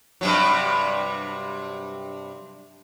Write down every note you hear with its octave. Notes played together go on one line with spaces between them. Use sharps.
G2 C3 F#3